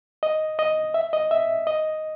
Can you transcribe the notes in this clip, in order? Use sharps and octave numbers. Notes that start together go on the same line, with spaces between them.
D#5
D#5
E5
D#5
E5
D#5